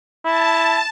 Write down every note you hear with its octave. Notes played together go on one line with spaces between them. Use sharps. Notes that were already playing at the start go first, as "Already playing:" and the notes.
E4 A5